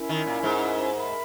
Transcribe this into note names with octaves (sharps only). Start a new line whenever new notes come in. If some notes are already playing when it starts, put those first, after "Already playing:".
Already playing: C#4 E4 A#4
D#3
A#2
G#2
A#4 E5 B5